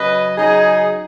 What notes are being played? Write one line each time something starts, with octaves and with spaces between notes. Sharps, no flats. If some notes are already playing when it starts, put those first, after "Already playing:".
Already playing: C#3 F#3 B4 D#5
C#3 F#3 D#4 G#4